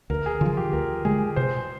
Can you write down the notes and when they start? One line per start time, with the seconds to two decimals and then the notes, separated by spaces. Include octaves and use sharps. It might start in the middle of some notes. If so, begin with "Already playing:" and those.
0.10 D2 A#4
0.26 G#4
0.41 D3 F3 F4
0.57 G4
0.73 D2 A#4
1.05 D3 G#3 G#4
1.36 C3 C5